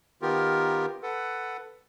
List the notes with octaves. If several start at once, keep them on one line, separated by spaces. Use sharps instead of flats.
D#3 B3 F4 G4 A#4
A4 B4 F#5